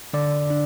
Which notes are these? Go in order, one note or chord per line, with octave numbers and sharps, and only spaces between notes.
D3 D5
D4